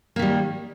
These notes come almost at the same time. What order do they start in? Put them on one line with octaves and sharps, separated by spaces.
A#3 D#3 G3